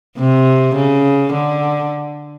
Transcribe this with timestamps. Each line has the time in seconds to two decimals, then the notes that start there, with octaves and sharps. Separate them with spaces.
0.18 C3
0.76 C#3
1.33 D3